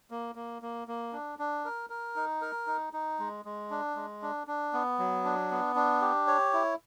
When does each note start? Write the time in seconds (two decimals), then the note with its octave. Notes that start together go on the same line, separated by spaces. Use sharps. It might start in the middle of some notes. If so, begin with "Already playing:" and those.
0.11 A#3
0.35 A#3
0.62 A#3
0.88 A#3
1.13 D4
1.39 D4
1.65 A#4
1.90 A#4
2.16 D#4
2.42 A#4
2.67 D#4
2.93 D#4
3.19 G#3
3.45 G#3
3.71 D4
3.95 G#3
4.22 D4
4.47 D4
4.73 B3
4.99 F#3
5.24 D4
5.51 B3
5.76 D4
6.01 G4
6.27 C#5
6.53 E4